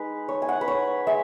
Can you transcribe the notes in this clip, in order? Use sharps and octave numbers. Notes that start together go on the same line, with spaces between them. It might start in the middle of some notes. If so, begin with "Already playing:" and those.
Already playing: G#3 D#4 B4
C#5
G#5
F#5
B4
C#5
G#3 E5